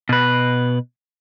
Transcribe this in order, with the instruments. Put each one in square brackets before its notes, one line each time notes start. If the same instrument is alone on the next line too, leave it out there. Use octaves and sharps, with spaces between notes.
[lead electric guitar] B2 B4